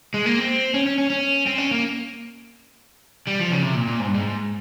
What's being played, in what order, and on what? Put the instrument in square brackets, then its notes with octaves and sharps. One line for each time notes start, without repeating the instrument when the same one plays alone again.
[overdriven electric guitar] G#3
A#3
C4
C#4
C#4
C#4
C#4
C4
C#4
A#3
G3
F3
C#3
C3
A#2
A#2
G#2
G2
G#2